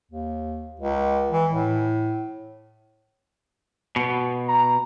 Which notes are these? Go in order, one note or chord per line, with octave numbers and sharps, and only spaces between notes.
D#2
C#2
E3
A2
B2
A#5